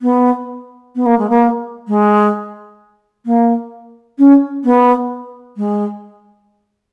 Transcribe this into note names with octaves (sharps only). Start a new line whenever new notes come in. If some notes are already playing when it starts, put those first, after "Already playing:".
B3
B3
A#3
G#3
A#3
G#3
A#3
C#4
B3
G#3